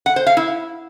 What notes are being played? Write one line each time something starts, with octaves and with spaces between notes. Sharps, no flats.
F#5
C5
F5
E4